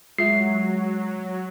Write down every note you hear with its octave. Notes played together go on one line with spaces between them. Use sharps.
F#3 G#3 F4 E5 C7